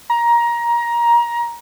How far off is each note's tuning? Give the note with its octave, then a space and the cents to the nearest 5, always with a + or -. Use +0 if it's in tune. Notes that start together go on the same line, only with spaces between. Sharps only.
A#5 +20